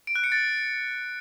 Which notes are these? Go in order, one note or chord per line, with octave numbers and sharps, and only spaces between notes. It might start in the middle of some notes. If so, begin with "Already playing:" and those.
D7
F#6
C#7
A6